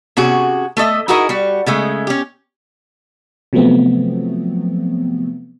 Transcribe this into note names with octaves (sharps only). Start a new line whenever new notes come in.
C3 C#4 F#4 G#4
A3 A4 D#5 E5
D#4 E4 F#4 G#4 A#4 D#5
G3 F#4
C#3 G#3 A3
C#4 G4
C3 F3 F#3 A3 B3 C4